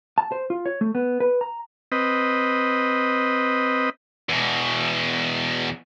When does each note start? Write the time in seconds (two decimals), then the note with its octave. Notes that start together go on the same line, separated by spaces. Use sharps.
0.18 A5
0.32 C5
0.50 F4
0.66 C#5
0.81 A3
0.95 B3
1.20 B4
1.41 A#5
1.92 C4 B4 D#5
4.29 E2 B2